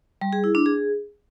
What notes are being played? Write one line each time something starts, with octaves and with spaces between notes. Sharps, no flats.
G3
G#4
E4
D4
G#4